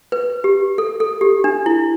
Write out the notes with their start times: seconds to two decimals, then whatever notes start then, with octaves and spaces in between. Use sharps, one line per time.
0.12 B4
0.44 G4
0.78 A4
1.00 A4
1.21 G4
1.44 D4
1.66 E4